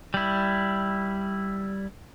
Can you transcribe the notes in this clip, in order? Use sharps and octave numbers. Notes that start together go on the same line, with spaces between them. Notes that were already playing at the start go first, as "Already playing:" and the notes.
G3 E4